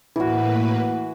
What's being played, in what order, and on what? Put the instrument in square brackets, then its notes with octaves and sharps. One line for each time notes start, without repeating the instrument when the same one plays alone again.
[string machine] A2 A#3 B4 [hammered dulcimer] E3 F#4